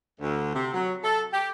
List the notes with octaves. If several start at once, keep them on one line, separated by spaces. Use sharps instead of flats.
D2
C3
F#3
A4
G4